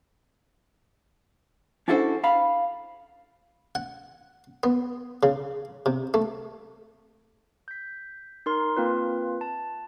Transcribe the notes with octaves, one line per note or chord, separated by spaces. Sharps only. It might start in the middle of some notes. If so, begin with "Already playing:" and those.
C#4 D4 E4 F#4 A4 C5
F5 B5
F#5
B3
C#3
C3
A3
G6 B6
D#4 A#4 C6
A#3 C4 F4 B4
A5